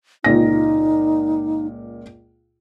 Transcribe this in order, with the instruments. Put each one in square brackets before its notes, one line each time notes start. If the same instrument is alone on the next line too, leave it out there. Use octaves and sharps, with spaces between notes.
[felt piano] C#2 A#2 A#6 [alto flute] D#4